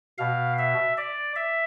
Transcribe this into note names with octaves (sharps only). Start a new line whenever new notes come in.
B2 F5
E5
D5
E5